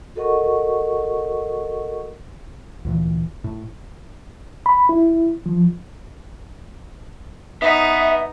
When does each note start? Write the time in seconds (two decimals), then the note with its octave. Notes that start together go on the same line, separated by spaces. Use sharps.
0.16 F#4 A4 A#4 D#5 F#5 C#6
2.85 D2 A#2 E3
3.44 A2
4.66 B5
4.89 E4
5.46 F3
7.62 B3 D#4 E5